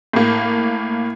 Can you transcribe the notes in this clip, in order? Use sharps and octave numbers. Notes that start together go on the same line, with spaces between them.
A2 A#3